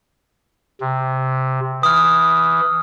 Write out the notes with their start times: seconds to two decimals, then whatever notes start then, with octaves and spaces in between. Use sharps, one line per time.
0.81 C3
1.83 E3 D#6 F6